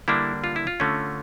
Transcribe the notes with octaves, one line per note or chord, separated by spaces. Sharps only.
D3 G3 A#3 D4 E4
F4
E4
F4
D3 A3 C#4